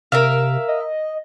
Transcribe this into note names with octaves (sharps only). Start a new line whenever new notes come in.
C3 A#4 E5 F5
D#5